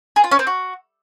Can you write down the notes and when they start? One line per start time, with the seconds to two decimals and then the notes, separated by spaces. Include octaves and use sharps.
0.16 G#4
0.24 F4
0.31 C#4
0.39 C4
0.47 F#4